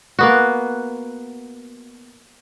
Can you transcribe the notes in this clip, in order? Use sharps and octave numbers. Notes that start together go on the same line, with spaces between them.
A#3 B3 F#4